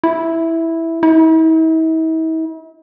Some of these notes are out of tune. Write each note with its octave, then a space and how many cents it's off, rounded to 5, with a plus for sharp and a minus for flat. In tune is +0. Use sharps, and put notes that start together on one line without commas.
E4 -5
E4 -45